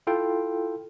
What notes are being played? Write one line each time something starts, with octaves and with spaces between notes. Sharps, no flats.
E4 F4 A4 F5 G5